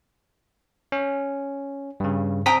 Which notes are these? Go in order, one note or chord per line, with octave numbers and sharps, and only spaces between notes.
C#4
G2 C#3
C4 G5 A#5 D#6 B6